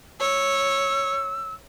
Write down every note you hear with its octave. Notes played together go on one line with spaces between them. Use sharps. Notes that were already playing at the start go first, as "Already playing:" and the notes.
C#5 E6